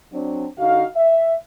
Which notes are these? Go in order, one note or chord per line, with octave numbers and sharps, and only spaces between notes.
F#3 C4 D4
D3 D#4 F#4 F5
E5